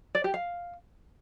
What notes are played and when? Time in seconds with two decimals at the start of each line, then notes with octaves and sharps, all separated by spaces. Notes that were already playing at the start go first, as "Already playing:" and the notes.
0.15 D5
0.24 G4
0.34 F5